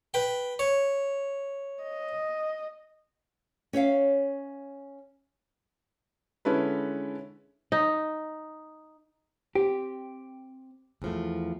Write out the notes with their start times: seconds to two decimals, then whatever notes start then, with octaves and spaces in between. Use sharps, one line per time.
0.14 B4 G5
0.59 C#5
1.83 D#5
3.73 C#4 C#5 E5 F5
6.45 D3 G#3 C#4 E4 A4 B4
7.72 D#4
9.55 C4 G4
11.02 E2 F3 A3